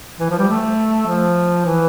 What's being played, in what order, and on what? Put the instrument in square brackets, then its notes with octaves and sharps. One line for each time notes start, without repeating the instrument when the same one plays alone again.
[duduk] E3
F3
G3
A3
F3
E3